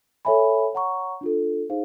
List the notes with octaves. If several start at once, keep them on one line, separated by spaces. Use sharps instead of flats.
A4 C#5 E5 G#5 B5
C#5 F#5 A#5 C#6
D4 F4 A4
D#4 G#4 C5 F5